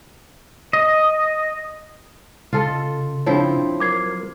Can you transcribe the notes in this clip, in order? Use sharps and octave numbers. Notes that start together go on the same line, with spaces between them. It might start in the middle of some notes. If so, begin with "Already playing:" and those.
D#5
C#3 F4 A4 D#5
F3 C4 D4 E4 C#5
F#3 A#4 D6 G#6 C7